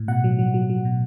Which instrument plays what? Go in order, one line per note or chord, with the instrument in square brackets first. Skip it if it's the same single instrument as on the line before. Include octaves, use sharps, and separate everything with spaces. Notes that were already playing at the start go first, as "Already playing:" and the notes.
Already playing: [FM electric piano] A2
B2 F#5
F#3
F#3
F#3
F#3
B2